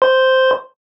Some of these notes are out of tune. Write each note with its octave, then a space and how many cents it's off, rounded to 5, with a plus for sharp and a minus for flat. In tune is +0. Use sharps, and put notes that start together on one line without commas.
C5 -5 C6 +0